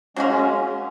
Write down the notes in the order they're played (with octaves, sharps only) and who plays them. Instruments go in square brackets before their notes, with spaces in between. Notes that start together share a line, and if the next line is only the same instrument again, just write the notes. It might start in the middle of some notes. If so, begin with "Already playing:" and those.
[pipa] F#3 A#3 F#4 A#4 [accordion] G#3 C#4
[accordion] G#3 C#4